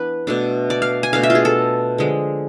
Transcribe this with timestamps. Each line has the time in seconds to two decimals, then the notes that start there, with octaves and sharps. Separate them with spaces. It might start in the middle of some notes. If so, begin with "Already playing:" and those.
Already playing: E3 B3 D4 B4
0.27 B2 A3 D4
0.70 D5
0.82 F5
1.03 G#5
1.13 B2 A3 D4 F5
1.23 E5
1.30 F4
1.35 G#4
1.45 A4
1.98 D3 F3 G#3